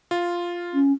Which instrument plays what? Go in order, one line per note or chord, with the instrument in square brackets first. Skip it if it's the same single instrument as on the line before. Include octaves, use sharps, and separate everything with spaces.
[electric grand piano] F4
[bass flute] C#4